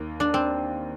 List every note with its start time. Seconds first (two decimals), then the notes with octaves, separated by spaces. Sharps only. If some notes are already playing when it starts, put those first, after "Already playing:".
Already playing: D#2 D#3 A#3
0.20 D4
0.34 C4